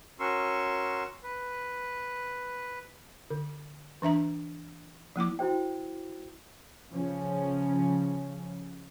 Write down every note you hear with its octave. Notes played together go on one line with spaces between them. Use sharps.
C#4 F#4 A#4 C6 C#6 E6
B4
D3
E3 D4 E5 A#5
F3 A#3 E4 D6
E4 F#4 C5 G5
C#3 F3 C#4